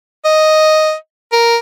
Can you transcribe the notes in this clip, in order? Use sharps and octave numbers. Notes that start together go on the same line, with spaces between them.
D#5
A#4